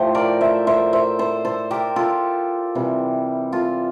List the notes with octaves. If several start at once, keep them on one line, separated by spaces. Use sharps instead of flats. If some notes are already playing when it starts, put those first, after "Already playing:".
Already playing: A2 F3 A3 G4 C5
A#4 D5
C5 E5
C5 E5
C5 E5
A4 C5
A4 C5
G4 A#4
F4 A4
C3 E3 G3
F4 A4